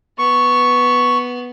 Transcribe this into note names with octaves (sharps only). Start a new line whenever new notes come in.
B3 C#6